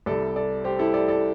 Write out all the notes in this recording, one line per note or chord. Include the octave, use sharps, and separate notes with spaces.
C2 C3 G3 A4 D5
A4 D5
G4 C5
E4 A4
A4 D5
A4 D5